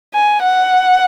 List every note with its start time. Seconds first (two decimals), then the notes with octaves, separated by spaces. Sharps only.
0.14 G#5
0.43 F#5